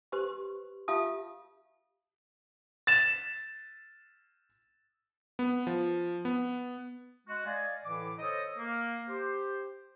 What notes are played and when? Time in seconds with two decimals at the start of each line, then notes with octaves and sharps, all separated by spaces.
0.12 G4 B4 C5 C6 C#6
0.88 F4 G4 E5 F5 A5 D#6
2.87 A6 E7
5.39 B3
5.67 F3
6.25 B3
7.27 G#3 F#4
7.45 D5 D#5 F5 G#5
7.84 A2 D3 E3 D6
8.18 A4 C5 C#5 D#5
8.58 A#3
9.08 G4 C5